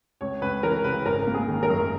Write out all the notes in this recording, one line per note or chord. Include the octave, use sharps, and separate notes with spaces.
C#2 C#5
C#2 B4
E3 A#4
C#3 B4
G#1 A#4
A#3
G#4
D#3
A#4
F#2